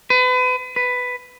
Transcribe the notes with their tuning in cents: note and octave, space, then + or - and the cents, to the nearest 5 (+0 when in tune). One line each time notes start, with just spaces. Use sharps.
B4 +35
B4 +10